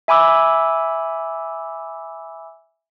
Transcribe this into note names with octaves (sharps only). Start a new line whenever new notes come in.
E5 G#5 B5 D6 E6